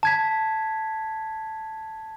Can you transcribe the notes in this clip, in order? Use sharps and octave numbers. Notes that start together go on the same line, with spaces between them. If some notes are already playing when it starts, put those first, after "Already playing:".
A5 G#6 B6